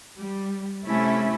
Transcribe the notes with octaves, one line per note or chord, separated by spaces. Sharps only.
G3
C3 A3 C#4 E4